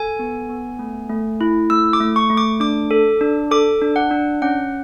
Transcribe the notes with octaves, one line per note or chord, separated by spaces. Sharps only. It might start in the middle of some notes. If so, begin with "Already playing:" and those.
Already playing: A4 G#5
B3
B3
A3
A3
E4
A3 E6
D6
A3
C#6
A3
D6
D4 D6
A4
D4
A4 D6
D4
F#5
D4
C#4 F#5